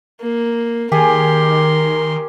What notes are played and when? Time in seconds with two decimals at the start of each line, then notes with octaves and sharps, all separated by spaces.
0.21 A#3
0.92 D#3 G4 G#4 A#4 G#5 C6